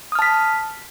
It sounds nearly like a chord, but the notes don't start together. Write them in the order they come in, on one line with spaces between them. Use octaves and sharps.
D#6 F6 A5 B6